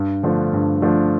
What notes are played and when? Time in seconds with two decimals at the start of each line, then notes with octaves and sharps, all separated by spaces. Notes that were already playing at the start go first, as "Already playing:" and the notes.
Already playing: G2
0.23 D3 F3 A3 D4
0.53 G2
0.82 D3 F3 A3 D4